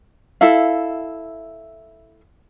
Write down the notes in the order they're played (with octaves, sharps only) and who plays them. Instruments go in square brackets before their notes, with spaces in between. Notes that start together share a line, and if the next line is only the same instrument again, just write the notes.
[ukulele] E4 A4 E5 F5